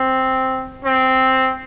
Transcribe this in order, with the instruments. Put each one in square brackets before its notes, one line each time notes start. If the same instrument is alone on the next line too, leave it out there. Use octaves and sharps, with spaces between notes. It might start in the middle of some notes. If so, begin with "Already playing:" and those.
Already playing: [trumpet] C4
C4